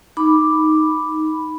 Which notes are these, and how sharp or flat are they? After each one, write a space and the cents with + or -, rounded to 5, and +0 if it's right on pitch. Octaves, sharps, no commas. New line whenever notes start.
D#4 +0 B5 +0 D6 +0